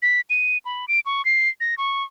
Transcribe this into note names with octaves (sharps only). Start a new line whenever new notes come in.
B6
D#7
B5
D7
C#6
C7
A#6
C#6